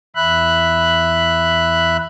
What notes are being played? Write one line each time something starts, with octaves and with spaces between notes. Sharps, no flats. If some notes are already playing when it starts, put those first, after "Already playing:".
E2 E5 B5 F#6